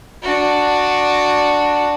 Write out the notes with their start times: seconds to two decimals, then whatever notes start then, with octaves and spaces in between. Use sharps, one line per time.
0.23 D4 F#4